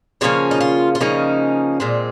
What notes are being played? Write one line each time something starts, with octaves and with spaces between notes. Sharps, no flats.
C#3 F3 A#3 C#4 C#5
D#4
F4
F4
C#3 F3 A#3 C#4 D#4
A#2 G#3 C4